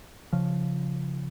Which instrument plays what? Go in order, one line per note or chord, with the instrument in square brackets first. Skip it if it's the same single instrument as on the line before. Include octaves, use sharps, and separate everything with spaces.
[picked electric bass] C#3 F3